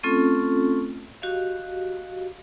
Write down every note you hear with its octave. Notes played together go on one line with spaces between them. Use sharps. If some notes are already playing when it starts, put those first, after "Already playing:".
A3 C4 C#4 F4 A4
F#4 G4 D#5 F5